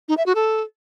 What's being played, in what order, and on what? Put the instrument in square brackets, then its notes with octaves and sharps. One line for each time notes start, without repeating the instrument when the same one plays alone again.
[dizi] D#4
E5
F#4
A4